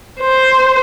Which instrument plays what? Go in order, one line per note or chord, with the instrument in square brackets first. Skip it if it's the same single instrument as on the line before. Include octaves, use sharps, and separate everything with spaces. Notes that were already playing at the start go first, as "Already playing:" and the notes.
[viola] C5